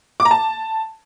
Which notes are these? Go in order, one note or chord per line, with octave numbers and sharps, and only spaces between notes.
D6
A#5
A5